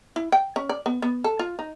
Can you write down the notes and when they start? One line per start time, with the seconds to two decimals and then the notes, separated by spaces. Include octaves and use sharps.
0.16 E4
0.32 G5
0.56 C#4
0.69 D5
0.86 B3
1.02 B3
1.24 A4
1.39 F4
1.59 D#4